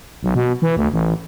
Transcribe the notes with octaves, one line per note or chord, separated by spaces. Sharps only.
B1
B2
E3
D2
A1